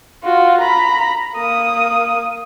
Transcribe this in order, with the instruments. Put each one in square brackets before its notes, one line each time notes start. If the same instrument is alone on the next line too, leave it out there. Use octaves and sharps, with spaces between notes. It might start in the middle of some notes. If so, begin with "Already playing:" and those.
[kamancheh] F4 F#4
A#5 B5
A#3 D#6